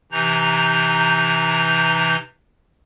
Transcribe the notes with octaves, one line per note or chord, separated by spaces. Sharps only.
C3 E3 D#4 A#5 G6